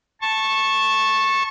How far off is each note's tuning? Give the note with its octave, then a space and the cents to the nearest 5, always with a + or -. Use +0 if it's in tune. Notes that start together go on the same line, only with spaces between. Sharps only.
A5 +0 C#6 -20